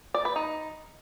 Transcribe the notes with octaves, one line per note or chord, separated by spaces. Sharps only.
D5
B4
D#4